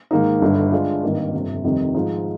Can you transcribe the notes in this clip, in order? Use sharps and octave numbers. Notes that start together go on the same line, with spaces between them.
G#2 D#3 A#3 D#4
G1 G2 D3
D3 G#3 D4 F4
G#1 G2 D#3 A#3
G1 F2 C3
F1 F2 C3 D#3 G3
G#2 F3 G#3 D#4